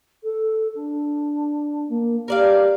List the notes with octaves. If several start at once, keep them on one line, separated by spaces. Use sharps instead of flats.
A4
D4
A#3
G4 A#4 D5 F5